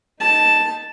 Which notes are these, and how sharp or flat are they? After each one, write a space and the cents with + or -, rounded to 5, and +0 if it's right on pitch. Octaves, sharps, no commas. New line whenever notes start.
D#4 +5 A5 +0